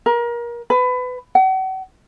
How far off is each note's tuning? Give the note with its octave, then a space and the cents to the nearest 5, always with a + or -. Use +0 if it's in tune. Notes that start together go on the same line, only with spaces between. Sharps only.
A#4 +30
B4 +25
F#5 +40